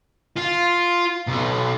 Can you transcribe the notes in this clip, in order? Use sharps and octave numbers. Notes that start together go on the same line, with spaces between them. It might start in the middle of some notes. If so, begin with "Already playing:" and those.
F4
B1